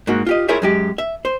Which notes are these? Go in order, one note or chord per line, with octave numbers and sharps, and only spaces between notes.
G#2 A#3 F#4
F4 G4 D#5
E4 F4 G#4 A#4 C#5 E5
F#2 G#3 G4
E5
C5